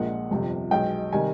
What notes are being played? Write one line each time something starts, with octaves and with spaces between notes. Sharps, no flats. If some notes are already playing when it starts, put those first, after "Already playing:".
Already playing: A#1 A#2 F3 G#3 F#5
G1 F2 C3 F3
B1 B2 G#3 G5
C3 D#3 G3 G#5